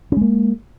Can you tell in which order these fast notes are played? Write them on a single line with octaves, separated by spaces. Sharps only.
C#4 G#3 A#3